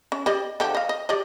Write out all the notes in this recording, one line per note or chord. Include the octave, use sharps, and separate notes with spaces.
C#4
G4 D5 D#5
D3 F3 G4
D#5 F5
D#5
G4 D5 D#5